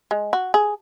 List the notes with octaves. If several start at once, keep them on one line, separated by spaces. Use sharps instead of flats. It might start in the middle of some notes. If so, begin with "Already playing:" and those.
G#3
F#4
G#4